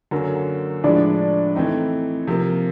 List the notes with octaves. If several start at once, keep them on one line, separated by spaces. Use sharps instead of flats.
F#2 D3 F#3 A#3
A2 F3 G#3 D4
E3 A3 C4 D#4
C3 F3 A#3